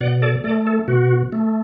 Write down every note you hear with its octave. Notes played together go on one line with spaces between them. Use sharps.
B2 D5 F#5
A4 D5
A3 A4 D5
A4
B2 F#4
A3